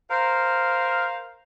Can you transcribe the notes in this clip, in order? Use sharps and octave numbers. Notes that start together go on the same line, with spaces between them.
A#4 C5 F5